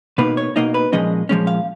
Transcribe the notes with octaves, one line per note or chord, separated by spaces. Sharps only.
B2 A#3 D#4 B4
C#5
B2 A#3 D#4 D#5
B4
A#2 F3 G#3 C#4 D#5
A#2 F3 G#3 C#4
F5